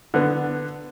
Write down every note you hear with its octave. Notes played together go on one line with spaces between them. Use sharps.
D3 B3